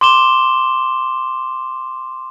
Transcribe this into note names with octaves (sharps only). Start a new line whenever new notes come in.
C6 D6 E7 G7